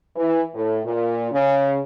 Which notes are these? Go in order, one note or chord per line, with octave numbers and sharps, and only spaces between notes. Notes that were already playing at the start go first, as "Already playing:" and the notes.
E3
A2
A#2
C#3